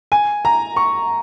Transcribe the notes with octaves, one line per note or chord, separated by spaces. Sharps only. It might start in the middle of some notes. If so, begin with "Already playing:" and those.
G#5
A#5
C#6